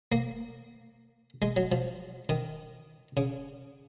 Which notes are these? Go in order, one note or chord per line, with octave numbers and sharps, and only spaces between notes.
A#3
G#3
F#3
F3
D#3
C#3